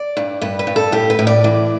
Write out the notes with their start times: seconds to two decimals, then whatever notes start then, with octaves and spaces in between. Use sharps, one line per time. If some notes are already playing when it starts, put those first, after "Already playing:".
Already playing: D5
0.17 G2
0.41 G2 B4
0.59 B4
0.67 G2
0.76 A4
0.92 A2 G4
1.10 B4
1.19 A2
1.27 D5
1.44 E3